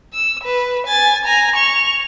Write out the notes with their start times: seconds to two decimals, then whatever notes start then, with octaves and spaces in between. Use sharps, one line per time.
0.14 E6
0.44 B4
0.87 G#5 A6
1.26 G#5 A#5
1.56 C#6 F7